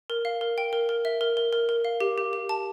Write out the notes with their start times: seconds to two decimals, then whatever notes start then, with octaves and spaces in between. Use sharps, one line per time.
0.10 A#4
0.25 F5
0.41 A#4
0.58 G5
0.73 A#4
0.89 A#4
1.05 E5
1.21 A#4
1.37 A#4
1.53 A#4
1.69 A#4
1.85 F5
2.00 G4
2.18 G4
2.33 G4
2.49 A5